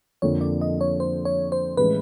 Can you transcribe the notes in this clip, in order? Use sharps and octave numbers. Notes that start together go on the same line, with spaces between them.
F2 D3 F3 A#3 C#5
D5
D#5
C#5
C5
C#5
C5
A2 E3 G#3 C#4 B4